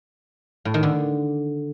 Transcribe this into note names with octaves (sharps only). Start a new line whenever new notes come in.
A2
D#3
D3